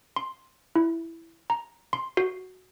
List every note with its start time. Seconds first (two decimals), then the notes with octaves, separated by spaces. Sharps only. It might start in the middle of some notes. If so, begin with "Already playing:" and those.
0.16 C6
0.76 E4
1.50 A#5
1.93 C6
2.17 F#4